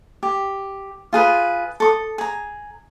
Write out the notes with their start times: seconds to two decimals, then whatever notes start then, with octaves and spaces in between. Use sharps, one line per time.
0.23 G4
1.13 F4 G#4 B4 B5
1.80 A4 C#6 D#6
2.18 G#4 A#5